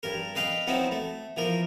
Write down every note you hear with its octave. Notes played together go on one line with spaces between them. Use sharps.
G2 A#4
B4 D#5 F5 G5
F#3 B3 C4 D#4 E4
A3
E3 F3 A#4